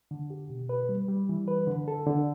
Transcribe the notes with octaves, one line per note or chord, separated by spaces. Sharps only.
D3
G4
B2
B4
G3
G3
E3
B4
D3
A4
D3